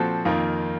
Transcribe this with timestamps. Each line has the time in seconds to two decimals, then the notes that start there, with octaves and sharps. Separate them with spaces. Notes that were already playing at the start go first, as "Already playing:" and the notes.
Already playing: A#2 F3 C4 F#4 A4
0.25 F2 D#3 A#3 F4